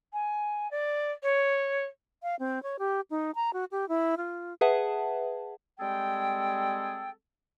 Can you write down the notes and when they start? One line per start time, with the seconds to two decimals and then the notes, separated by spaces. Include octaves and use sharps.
0.12 G#5
0.70 D5
1.22 C#5
2.23 F5
2.39 C4
2.63 C#5
2.79 G4
3.10 D#4
3.35 A#5
3.53 F#4
3.71 G4
3.89 E4
4.17 F4
4.61 G#4 B4 E5 F#5 A5
5.80 G3 G#3 C4 G#4 A4 G5